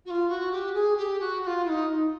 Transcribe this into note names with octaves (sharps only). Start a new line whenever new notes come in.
F#4
F4
F#4
G4
G#4
G4
F#4
F#4
F4
E4
D#4